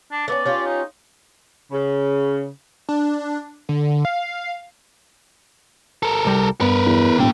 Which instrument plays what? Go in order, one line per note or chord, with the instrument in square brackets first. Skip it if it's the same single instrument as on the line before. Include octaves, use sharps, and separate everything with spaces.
[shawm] D4
[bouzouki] A3 B3 C#4 [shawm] D5
[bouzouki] C#4 F4 G4
[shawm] D#4
[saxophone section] C#3
[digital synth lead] D4
D3
F5
[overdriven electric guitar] A4 A#4
[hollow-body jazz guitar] C2 G3 A#5
[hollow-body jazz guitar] G2 B3 [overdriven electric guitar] A#4 B4
[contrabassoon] E2
[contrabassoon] E1 [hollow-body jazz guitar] A2 C3 [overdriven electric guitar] A#3 G5